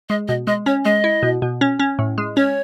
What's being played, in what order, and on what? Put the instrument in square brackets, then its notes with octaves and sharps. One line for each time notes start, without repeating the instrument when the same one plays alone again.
[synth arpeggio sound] G#3 [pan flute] D#5
[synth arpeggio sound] B2 [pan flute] D#5
[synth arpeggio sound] G#3 [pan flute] D#5
[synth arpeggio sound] C#4 [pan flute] C#5
[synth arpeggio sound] G#3 [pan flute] D#5
[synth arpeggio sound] E4
B2
B2
C#4
C#4
A2
G#3
[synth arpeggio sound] C#4 [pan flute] C#5